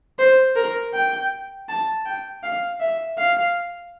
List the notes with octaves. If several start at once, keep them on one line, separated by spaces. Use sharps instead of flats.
C5
A#4
G5
A5
G5
F5
E5
F5